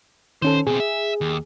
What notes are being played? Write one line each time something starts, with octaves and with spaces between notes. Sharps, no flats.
D#3 C#4 A4 C5
B2 C4 G#4
E5
D#2